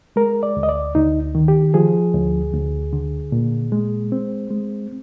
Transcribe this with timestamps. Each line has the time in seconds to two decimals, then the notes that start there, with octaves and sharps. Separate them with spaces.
0.16 G#3 A#4
0.43 D5
0.57 D2
0.63 D#5
0.69 D5
0.95 D2 D#4
1.35 D#3
1.48 G4
1.74 F3 G#4
2.15 D2
2.54 D2
2.93 D3
3.32 A#2
3.72 G#3
4.12 C4
4.51 G#3